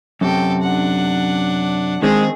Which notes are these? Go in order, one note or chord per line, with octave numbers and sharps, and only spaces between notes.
F#2 C3 A4 G5
D4 F#5
D#3 G#3 C4 D#4 G#4